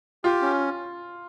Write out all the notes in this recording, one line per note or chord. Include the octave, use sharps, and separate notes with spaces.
F4 G4
C#4